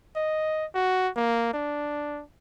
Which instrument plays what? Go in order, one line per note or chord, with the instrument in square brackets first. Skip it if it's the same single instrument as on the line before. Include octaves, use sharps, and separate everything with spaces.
[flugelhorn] D#5
F#4
A#3
D4